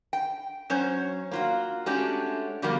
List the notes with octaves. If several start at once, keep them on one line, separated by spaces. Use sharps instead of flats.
G5
F#3 C#4 C5 C#5
A#3 F4 F#4
G#3 A3 C#4 D4 F#4 G4
D3 F3 G3 A#3 B3 F#4